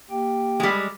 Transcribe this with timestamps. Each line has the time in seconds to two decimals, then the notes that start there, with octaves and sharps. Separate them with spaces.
0.10 A#3 G4 G5
0.60 G3 G#3